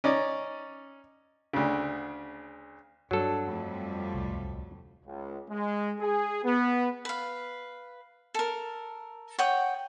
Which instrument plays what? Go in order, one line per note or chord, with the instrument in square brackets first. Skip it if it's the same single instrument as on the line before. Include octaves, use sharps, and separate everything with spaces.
[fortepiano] C#4 D#4 D5
D2 C#3
[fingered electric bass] G2 [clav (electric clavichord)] F#3 A4 [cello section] D4
[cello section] F2 G3 A3
[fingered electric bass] D1 C2
[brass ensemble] C#2
G#3
G#4
B3
[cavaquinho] B4 F5
A4 A#4
C#5 F#5 G5 D#6